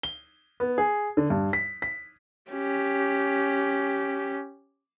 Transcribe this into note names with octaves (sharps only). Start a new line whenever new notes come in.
G7
B3
G#4
D3
G2
B6
B6
C#4 G4